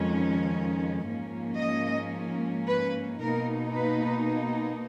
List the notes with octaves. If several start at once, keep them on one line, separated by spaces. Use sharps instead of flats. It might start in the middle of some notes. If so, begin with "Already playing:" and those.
Already playing: F2 D#3 G#3 C#4
G#2 F3 A#3 C#4
D#5
B4
B2 A#3 D#4 A#4
B4